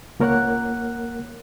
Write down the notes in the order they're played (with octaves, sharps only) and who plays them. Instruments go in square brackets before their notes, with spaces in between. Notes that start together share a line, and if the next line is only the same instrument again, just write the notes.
[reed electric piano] C#2 A#3 A#4 C#5 F#5 F#6